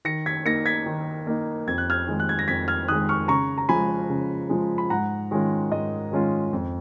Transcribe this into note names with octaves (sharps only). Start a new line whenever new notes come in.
D#3 A#6 C#7
G#6 B6
A#3 D#4 A#6 C#7
G#6 B6
D#3
A#3 D#4
F2 G#6
F#6
F6 G#6
D#3 G#3
F#6
G#6
A#6
F2 G#6 B6
F6 G#6
D#3 G#3 D#6 F#6
C#6 F6
C#3 A#5 C#6
A#5
F3 G#3 G#5 B5
C#3
F3 G#3
B5
G#2 F#5 A#5
D#3 G#3 C#4 F4
G#2 D#5
D#3 G#3 C#4 F4
F2